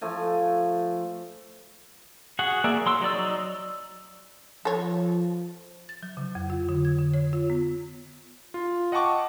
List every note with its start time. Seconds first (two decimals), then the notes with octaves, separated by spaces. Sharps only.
0.01 F3 A3 G#5
2.39 F#4 G#4 F#5
2.64 A#3 G#4 D5 E5
2.86 F#3 C6 E6
3.01 F#3 D#4 D5 E6
4.65 F3 A4 C#5
5.89 A6
6.03 F#3
6.17 C#3
6.35 F2
6.50 F4
6.69 D3
6.85 G#6
6.99 D3
7.14 C#5
7.33 F4
7.50 B3
8.54 F4
8.92 D#5 F#5 G5 A5 C#6 D6